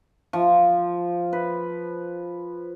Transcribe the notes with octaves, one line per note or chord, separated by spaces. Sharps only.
F3
B4